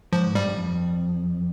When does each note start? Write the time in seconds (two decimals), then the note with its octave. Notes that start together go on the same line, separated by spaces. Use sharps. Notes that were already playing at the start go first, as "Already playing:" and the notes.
0.13 G#2 F3
0.35 G2 G3
0.56 F2